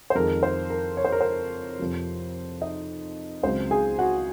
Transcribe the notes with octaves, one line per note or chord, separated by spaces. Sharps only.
C5
F2 D#3 G#3 A#4
C5
A#4
C#5
C5
A#4
C5
F2 C3 F3
D#4 D#5
C#2 C#3 F#3 C4 C5
G#4 G#5
F#4 F#5